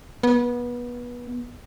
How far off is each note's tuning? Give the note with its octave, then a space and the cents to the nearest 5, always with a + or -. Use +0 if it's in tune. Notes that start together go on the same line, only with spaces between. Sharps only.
B3 -25